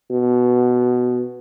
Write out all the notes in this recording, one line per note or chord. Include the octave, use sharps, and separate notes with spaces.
B2